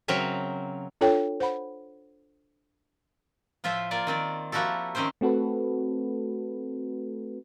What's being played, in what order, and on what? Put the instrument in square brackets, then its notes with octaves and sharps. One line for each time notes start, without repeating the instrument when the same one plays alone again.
[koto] C#3 F#3 C4 A#4 E5
[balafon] D4 F4 A4 C#5 G5
C5 F#5 B5
[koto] A2 F3 F4 C5 E5
A#3 F4 D5
D#3 C4 D5
F3 A#3 E4 F#4 G4 A4
D#3 C4 C#4 G4 C5
[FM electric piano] A3 C4 F#4 A4 B4